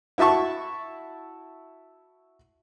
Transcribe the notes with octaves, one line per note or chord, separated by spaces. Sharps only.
E4 F#4 E5 A5 C#6